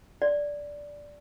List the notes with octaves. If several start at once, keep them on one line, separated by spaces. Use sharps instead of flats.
D5